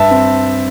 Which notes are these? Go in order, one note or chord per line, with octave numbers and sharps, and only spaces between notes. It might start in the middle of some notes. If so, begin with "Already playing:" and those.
Already playing: G2 E5 A5
C4